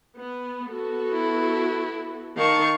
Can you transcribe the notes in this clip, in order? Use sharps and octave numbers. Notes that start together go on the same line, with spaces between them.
B3
B3 F#4 A4
E4
D#3 F5 A5 C#6